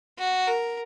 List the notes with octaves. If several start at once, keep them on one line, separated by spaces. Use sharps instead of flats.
F#4
A#4